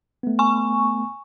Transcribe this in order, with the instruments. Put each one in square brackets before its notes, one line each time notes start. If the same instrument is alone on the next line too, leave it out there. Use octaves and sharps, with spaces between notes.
[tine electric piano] A3 B3
[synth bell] G#5 C#6